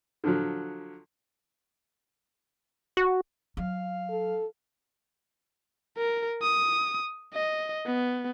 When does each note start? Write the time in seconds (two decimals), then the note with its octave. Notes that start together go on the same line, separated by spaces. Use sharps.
0.24 D3 F3 F#3
2.97 F#4
3.57 F#3 F5
4.10 A4
5.98 A#4
6.43 D#6
7.34 D#5
7.86 B3